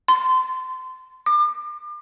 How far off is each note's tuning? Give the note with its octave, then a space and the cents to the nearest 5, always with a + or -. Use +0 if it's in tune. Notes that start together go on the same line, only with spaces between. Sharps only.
C6 -25
D6 +40